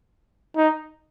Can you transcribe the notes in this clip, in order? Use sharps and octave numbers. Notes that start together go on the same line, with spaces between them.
D#4